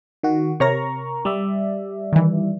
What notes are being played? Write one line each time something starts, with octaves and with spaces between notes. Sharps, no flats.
D#3 F#4
C3 A#4 C#5 A#5 C#6 A#6
G3 D5 E5
D#3 E3